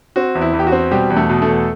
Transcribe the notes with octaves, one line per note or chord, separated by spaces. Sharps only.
C4 F#4
E2
E4
E2
G4
F#4
C4
B2 G3 G4
E2
A3 A4
B2
A3 A4
E2